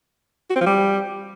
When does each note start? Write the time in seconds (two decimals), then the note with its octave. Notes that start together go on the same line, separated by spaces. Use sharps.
0.50 F#4
0.55 C4
0.61 F3
0.66 G3